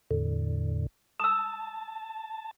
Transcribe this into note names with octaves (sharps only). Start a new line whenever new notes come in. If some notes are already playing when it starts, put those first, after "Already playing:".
E2 A2 D3
A5 D#6 E6